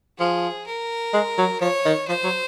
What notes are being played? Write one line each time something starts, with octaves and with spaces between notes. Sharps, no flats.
F3 G#4
A#4
G#3
F#3
F3 C#5
D#3
F3 C5
F#3